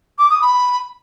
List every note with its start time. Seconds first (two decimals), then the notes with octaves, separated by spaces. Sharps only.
0.18 D6
0.30 D#6
0.42 B5